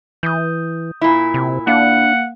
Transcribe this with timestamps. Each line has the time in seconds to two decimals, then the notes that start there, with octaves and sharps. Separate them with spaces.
0.23 E3 D#6 G6
1.01 A#2 E4
1.34 C3
1.67 A#3 D4 F5 F#5